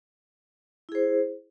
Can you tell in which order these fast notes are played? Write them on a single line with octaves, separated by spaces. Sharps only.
E4 G#4 C5